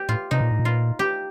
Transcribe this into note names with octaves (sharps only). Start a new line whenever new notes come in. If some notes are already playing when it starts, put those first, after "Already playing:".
Already playing: G4
A2 F4
C3 D#4
A#2
A2
A#2
F4
G4